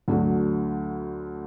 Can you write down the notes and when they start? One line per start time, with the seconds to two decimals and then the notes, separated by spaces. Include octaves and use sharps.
0.08 D2 D3 F#3